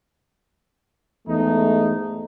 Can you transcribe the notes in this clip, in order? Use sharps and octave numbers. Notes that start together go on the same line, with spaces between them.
E2 G#2 A3 D#4